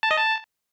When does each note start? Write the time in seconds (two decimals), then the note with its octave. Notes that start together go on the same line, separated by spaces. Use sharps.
0.03 A5
0.11 D#5
0.18 A5